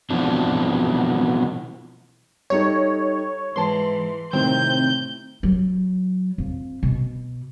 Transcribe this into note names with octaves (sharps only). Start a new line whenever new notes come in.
B2 E3 F3 C4 D4
G3 D#4 A4 C#5
G#2 E3 B4 A5 C6
A2 C3 D#3 C4 G6
F#3
F2
B2